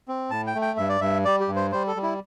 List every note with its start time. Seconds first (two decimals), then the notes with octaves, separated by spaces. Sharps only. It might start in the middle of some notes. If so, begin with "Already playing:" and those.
0.08 C4
0.30 A2 A5
0.47 G5
0.55 A3
0.62 G5
0.77 G2 E5
0.89 D5
1.01 G2 E5
1.25 G3 D5
1.40 G4
1.48 G2
1.56 C5
1.72 G3 C5
1.87 A4
1.96 G3
2.03 E4